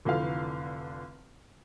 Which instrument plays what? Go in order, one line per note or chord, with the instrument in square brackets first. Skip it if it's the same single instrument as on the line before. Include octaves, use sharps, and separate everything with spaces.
[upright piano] F1 D3 E3 F3 F5